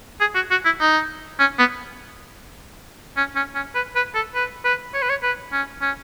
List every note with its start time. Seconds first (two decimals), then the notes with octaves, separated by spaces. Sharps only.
0.20 G#4
0.35 F#4
0.51 F#4
0.65 E4
0.80 D#4
1.39 C#4
1.58 B3
3.17 C#4
3.35 C#4
3.55 C#4
3.75 B4
3.96 B4
4.14 A4
4.35 B4
4.64 B4
4.94 C#5
5.02 B4
5.09 C#5
5.22 B4
5.52 C#4
5.81 C#4